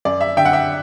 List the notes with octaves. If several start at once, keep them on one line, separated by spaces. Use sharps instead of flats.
F#2 D5
E5
D3 E5 G5
F#5
E5 G5